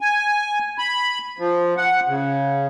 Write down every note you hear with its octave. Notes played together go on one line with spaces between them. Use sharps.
G#5
B5
F3
F#5
C#3